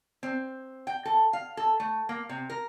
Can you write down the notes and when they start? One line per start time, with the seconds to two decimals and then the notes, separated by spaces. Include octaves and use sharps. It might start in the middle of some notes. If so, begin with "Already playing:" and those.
0.23 C4
0.87 G5
1.05 A4
1.33 F5
1.57 A4
1.80 A3
2.09 A#3
2.29 C3
2.50 A#4